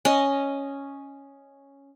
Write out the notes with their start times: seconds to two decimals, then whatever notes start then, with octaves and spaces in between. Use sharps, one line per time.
0.05 C#4 D#5